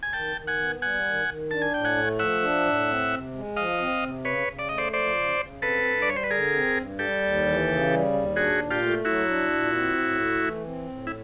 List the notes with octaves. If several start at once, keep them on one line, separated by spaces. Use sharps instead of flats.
G#5
D#3 G5 A5
D#3
F#5 G#5
B3
G3 F#5 G#5
D#3
D#3
D4 A5
G#5
A2 G5
F#5 G#5
A3
F3 E5 F#5
D4
A2
C4
C3
G#3
F3 D#5 F5
C4
C3
C#3 B4 C#5
C#3
D5
A3 D#5
C5 D5
F3 C5 D5
C#3
C#3
C4 A4 B4
G2
D5
G3 C#5
C5
B4
D3 G#4 A#4
C4
G2
G3 G4 A4
D#2
E3
C#3
G3
D#2
D4 F#4 G#4
A#2
F4 G4
A3
F#3 E4 F#4
D4
A#2
C4
A2
A3
E3
C4
A2
E4